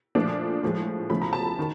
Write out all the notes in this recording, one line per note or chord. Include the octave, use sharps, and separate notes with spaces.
A#2 F3 A3 D4
A2 F3 G#3
E2 C#3 F3 A3 B5
A#5
A5 B5
D#3